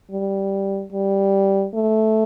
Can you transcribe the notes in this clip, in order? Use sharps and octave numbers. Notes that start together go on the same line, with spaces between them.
G3
G3
A3